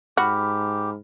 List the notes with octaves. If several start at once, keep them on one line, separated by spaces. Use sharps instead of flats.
G#2 F#4 G4 B5 F6